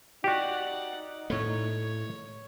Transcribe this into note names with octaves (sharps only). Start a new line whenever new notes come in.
D#4 F#4 G4 D5 F#5
A2 A3 C#5